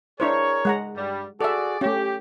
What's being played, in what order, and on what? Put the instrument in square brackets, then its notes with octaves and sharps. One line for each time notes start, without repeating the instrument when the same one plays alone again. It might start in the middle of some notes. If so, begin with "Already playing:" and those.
[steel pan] D4 E4 C5 [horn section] G#4 A#4 C#5
[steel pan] G#3 F#5 A#5
[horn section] G2 G3
[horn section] F#4 G#4 D5 [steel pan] A4 E5
[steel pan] A3 C#4 [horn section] G4